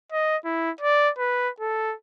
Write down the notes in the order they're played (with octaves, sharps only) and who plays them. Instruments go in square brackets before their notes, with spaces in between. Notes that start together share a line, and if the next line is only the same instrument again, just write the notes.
[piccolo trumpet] D#5
E4
D5
B4
A4